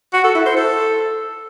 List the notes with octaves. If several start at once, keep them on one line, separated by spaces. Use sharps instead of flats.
F#4
A4
E4
C5
A4